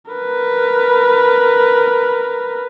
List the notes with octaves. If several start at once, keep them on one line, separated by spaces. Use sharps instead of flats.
A#4 B4